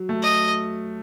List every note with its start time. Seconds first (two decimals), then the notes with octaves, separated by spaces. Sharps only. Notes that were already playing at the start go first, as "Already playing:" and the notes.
Already playing: F#3
0.09 A3
0.23 D#5